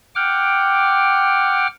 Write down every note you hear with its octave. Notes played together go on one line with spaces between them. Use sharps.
F#5 G5 D6 F6